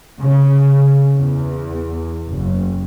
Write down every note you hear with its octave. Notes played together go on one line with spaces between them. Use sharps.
C#3
E2
F#1